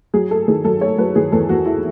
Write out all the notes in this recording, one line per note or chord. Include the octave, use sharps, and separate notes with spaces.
F#3 G#4
A3 A4
D#3 G#4
F#3 A4
A3 C#5
F#3 B4
D#3 G#4
E2 A4
E2 F#4
E4